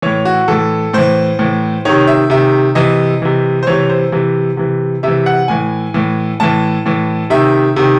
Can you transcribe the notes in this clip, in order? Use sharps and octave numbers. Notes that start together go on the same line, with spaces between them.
A2 E3 C#5
F#4
A2 E3 A4
A2 E3 C5
A2 E3
C3 D#3 C#5
E5
C3 D#3 E5
C3 E3 D#5
C3 E3
C5
C3 E3 C#5
C5
C3 E3
C3 E3
C3 E3 E5
F#5
A2 E3 G#5
A2 E3
A2 E3 A5
A2 E3
C3 D#3 E5
C3 D#3